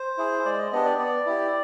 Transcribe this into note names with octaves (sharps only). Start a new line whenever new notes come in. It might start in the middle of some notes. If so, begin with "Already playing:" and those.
Already playing: C5
E4 G#4
G#3 D5
D#5
B3 D4 G4 D#5
D5
B3 D5
E4 G4